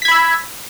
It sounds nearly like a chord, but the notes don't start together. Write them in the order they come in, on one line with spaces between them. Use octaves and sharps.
B6 G#6 B5 E6